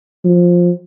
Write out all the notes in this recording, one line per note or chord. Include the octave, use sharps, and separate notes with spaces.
F3